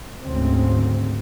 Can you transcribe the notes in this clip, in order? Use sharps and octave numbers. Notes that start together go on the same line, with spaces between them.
D2 G#2 C#3 C4